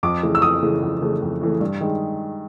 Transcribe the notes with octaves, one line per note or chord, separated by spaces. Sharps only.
F2 D6
C#3 E3 A3
E6
F2 D#6
C#3 E3 A3
F2
C#3 E3 A3
F2
C#3 E3 A3
G2
D#3 G#3